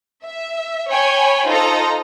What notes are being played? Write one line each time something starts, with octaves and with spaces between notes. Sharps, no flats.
E5
C#5 G5 G#5 B5
D#4 F4 A4 C5 D#5 A#5